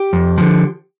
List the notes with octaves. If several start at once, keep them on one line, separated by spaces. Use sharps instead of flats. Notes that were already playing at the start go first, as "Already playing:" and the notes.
Already playing: G4
F2
D3 F3